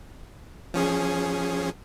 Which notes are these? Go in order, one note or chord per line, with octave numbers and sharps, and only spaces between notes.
F3 C#4 G#4